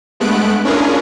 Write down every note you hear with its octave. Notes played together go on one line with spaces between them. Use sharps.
G2 G#3 A3 B3 F#6 D7
C#4 D4 E4 F4 G#4 A#4